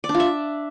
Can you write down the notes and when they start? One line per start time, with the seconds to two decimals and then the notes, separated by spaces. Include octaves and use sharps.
0.04 D5
0.09 D4
0.14 F4
0.20 E5